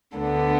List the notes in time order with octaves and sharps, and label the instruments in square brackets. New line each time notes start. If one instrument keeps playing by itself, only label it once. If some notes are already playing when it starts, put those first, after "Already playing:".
[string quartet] D2 D3 B3 D4